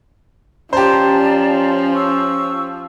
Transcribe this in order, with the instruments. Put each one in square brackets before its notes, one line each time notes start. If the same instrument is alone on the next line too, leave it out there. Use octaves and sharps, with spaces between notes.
[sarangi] F3 [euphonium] C#4 [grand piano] G4 C5 [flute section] D5 A5 A#5
[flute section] C#6 E6